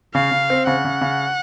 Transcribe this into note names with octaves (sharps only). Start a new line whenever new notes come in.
C#3 F5
C#3
C4
C#3 F#5
C#3
C#3